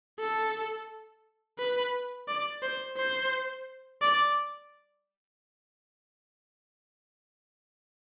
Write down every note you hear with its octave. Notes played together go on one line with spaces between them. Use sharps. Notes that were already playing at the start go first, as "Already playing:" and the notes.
A4
B4
D5
C5
C5
D5